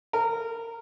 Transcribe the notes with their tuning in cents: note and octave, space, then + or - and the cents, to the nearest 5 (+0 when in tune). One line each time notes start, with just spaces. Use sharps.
A#4 -20